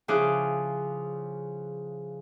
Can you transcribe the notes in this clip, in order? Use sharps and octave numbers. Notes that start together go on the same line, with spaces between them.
C#3 F3 E4 G#4 D6 F#6